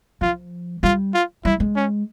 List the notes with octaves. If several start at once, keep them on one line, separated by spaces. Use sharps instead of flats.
F3 F4
G3 F4
F4
G3 E4
G#3
C#4